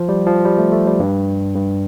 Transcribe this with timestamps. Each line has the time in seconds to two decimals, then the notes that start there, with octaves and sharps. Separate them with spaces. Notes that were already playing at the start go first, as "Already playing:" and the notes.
Already playing: F3
0.09 G3
0.26 F3
0.45 G3
0.58 A3
0.72 A3
0.87 G3
1.00 G2
1.55 G2